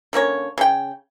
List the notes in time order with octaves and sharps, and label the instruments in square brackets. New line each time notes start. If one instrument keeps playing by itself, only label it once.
[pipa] D3 A#3 C#4 C#5
C#3 G5